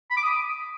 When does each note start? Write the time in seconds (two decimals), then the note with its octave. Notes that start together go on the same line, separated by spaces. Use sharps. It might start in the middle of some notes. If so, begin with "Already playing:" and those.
0.11 B5
0.17 D6
0.23 D#6